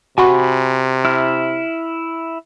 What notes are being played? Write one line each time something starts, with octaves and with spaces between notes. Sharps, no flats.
C3 F#4 F#5 G#5 B5 C#6
E4 F6